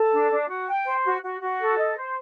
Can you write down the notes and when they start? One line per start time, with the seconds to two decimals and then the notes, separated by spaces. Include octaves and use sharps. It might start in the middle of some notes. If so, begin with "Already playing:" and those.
Already playing: A4
0.12 D4
0.31 D4
0.48 F#4
0.67 G5
0.86 C5
1.04 F#4
1.23 F#4
1.41 F#4
1.60 A4
1.78 D#5
1.96 C5